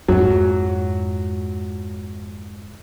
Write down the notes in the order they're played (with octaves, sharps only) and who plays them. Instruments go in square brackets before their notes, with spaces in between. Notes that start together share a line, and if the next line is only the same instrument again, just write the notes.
[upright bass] F2 G#2 [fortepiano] F#3